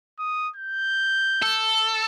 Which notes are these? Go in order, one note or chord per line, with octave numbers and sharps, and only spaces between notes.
D#6
G6
A4